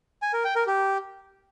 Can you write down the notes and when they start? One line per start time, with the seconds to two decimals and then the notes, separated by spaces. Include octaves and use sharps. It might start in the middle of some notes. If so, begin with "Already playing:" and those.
0.22 G#5
0.33 A#4
0.44 G5
0.56 A#4
0.67 G4